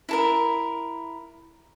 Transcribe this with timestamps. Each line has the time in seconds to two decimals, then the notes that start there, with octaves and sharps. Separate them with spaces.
0.09 E4 A4 A#4